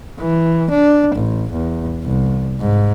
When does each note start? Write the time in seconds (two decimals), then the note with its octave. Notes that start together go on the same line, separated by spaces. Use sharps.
0.19 E3
0.71 D4
1.15 A1
1.52 E2
2.04 C2
2.60 G#2